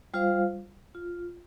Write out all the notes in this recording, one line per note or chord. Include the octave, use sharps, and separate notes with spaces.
G3 F4 C5 F5
F4